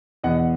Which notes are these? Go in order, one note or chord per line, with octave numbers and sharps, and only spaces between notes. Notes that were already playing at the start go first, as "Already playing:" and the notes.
E2 B2 D#5 F#5